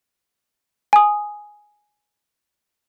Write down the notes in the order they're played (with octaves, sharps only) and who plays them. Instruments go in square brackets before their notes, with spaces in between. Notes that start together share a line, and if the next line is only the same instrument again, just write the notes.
[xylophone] G#5 D#6